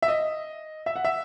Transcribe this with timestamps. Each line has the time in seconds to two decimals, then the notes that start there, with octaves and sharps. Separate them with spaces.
0.02 E5
0.08 D#5
0.86 E5
0.96 F#5
1.05 E5